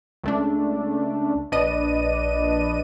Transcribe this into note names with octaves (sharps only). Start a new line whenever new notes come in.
C#2 A3 D4
A#1 D4 B4 D5 D#5 D#7